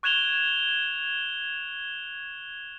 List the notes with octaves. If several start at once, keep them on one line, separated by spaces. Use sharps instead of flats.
C#6 F#6 G#6 E7 F7 G7